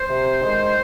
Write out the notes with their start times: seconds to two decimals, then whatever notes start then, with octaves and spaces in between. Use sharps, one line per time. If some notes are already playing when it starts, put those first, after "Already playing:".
Already playing: C5
0.08 C3
0.41 D#3 G#3